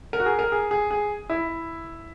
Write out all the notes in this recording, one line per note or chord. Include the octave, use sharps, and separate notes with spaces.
A#4
F#4
G#4
A#4
G#4
G#4
G#4
E4